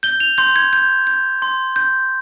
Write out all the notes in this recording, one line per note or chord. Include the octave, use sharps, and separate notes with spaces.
G6 G7
F7
C6 G6
G#6
G6
G6
C6
G6